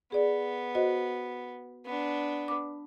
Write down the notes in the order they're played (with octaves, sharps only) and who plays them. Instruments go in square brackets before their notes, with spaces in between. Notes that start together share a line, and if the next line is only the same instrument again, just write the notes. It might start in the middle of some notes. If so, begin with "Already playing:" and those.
[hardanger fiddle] B3 [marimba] G#4 D5
[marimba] F#4 C5 D#5
[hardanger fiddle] B3 D4
[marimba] D6